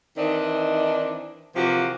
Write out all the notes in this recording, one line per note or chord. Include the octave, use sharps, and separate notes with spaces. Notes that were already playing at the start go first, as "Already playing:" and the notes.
D#3 E3 C4 D4 D#4
C3 E3 F3 A#3 F#4 G4